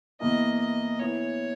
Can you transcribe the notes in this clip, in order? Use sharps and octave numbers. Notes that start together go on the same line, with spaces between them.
E2 B2 A#3 E4 D#5
D#5
E3 B3 E4 C#5